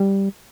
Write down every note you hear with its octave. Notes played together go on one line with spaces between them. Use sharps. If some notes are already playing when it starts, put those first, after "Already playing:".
Already playing: G3